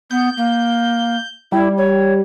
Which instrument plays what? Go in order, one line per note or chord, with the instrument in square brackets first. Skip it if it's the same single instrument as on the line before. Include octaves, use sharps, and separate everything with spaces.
[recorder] B3 [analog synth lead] G6
[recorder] A#3
[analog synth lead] G3 [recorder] E4
[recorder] C#5